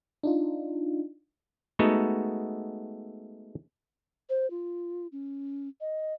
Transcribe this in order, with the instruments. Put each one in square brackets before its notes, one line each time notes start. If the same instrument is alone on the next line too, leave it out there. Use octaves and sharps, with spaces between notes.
[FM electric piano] D4 D#4 F4
[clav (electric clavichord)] G#3 A3 B3 D#4 F#4 A4
[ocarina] C5
F4
C#4
D#5